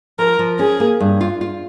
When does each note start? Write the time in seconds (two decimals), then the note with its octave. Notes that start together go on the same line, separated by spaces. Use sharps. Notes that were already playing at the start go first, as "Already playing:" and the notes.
0.19 F3 A#4
0.39 F3
0.59 C#4 G#4
0.80 A#3
1.00 G2
1.21 F4
1.41 F4